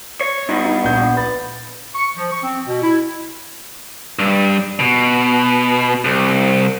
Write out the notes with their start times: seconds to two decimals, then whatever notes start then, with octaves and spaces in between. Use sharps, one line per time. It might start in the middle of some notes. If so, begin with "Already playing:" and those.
0.21 C#5
0.49 G2 B3 D#4
0.65 D#4
0.84 A#1 G6
1.17 B4 A6
1.95 C#6
2.17 F3
2.31 C#6
2.43 C4
2.67 B2
2.83 E4
4.19 G2
4.80 B2
6.05 C2